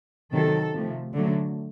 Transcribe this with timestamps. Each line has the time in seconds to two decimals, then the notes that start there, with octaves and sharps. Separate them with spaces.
0.32 C3 D#3 F#3 A4
0.73 C3 F3 A3
1.14 D3 F#3 A3